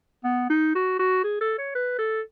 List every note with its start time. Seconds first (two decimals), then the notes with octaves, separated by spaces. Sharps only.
0.24 B3
0.50 D#4
0.75 F#4
0.99 F#4
1.24 G#4
1.41 A4
1.58 C#5
1.75 B4
1.99 A4